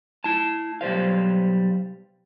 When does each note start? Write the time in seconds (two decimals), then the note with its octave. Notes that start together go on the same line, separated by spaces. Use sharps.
0.24 E4 A5
0.81 B1 G3 C5 F5